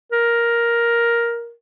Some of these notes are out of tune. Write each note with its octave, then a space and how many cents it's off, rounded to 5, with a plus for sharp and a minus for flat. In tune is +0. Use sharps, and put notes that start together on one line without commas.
A#4 +5